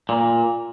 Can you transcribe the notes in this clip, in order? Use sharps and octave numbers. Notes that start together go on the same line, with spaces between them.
A#2